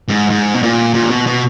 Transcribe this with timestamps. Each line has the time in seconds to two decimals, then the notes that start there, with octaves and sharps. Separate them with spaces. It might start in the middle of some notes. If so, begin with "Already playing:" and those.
0.08 G#2
0.30 G#2
0.54 B2
0.63 A#2
0.94 A#2
1.03 D3
1.10 B2
1.27 B2